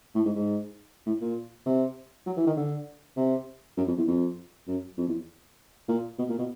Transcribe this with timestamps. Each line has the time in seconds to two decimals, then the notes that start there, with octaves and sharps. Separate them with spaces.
0.15 A2
0.25 G#2
0.36 G#2
1.06 A2
1.21 A#2
1.66 C3
2.26 F#3
2.37 E3
2.47 D#3
2.57 D3
3.17 C3
3.77 F#2
3.87 F2
3.97 E2
4.08 F2
4.68 F#2
4.98 F2
5.07 E2
5.88 A#2
6.19 B2
6.29 A#2
6.39 B2